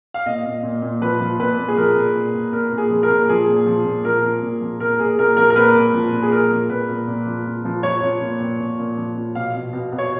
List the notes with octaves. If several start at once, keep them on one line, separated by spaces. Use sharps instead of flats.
F5
A#2 D#5
A#2
A#2
A#2
F3 B4
F3
A#2 B4
A#2
G#4
F3 A#4
A#2
A#2
A#2
A#2 A#4
A#2
G#4
F3
A#4
A#2
F3 G#4
A#2
F3
A#2
F3 A#4
F3
A#2
F3
A#2 A#4
A#2 G#4
A#2 A#4
F3 A#4
A#4
A#2 B4
A#2
F3
A#2
G#4
A#2 A#4
F3
A#2 B4
A#2
A#2
F3
F3
F3
F3 C#5
F3
A#2
A#2
A#2
A#2
F3
F3
B2 F5
B2
B2
B2
C#5